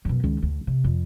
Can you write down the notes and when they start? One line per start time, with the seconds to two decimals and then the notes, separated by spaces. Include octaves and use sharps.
0.05 F#2 B2
0.24 C#2 D#3
0.42 D2
0.67 C3
0.84 F2